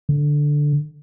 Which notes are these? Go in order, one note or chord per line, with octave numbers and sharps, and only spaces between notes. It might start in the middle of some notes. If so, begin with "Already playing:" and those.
D3